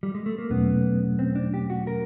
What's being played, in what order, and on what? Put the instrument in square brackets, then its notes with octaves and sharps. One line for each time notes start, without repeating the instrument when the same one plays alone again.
[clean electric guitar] G3
G#3
A3
A#3
[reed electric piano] E2 B2 F#3 A3 C#4 [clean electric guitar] B3
[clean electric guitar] C4
D4
G4
F#4
A#4